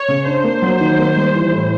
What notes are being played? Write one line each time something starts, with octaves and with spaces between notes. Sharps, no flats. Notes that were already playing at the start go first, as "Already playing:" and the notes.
Already playing: C#5
C#3
D4 C5
A#3
F#3
D#3
A#3
G3
E3
A2